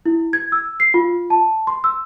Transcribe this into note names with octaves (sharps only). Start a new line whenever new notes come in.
E4
G#6
E6
C7
F4
A5
C6
E6